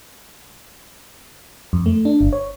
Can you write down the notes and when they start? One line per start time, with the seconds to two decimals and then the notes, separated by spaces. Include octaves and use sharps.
1.73 F2
1.86 A3
2.05 D4
2.21 G1
2.33 C#5